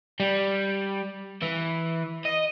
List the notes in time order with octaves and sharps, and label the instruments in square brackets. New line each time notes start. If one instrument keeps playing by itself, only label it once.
[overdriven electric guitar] G3
E3
D#5